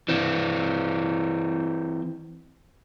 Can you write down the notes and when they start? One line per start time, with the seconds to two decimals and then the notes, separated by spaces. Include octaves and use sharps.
0.09 E3 C4